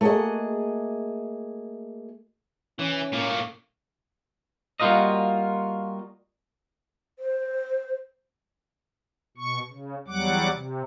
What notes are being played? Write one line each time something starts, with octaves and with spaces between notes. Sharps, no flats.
A3 A#3 F#4 G#4 D#5
E3 C#4
A2 A#3
G3 A#3 F4 F#4 A#4 D#5
C5
B2 C#6
C#3
E2 F#3 G3 F#5 D6
C3